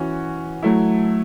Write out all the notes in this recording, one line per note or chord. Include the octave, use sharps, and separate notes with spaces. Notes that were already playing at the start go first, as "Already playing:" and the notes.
Already playing: E3 C#4 F#4
F#3 A3 E4